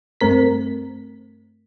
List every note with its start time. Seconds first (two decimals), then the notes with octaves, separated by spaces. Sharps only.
0.21 G2 A3 C4 A#4 B6